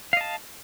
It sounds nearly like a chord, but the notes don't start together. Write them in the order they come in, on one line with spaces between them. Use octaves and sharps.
F5 D#5 A5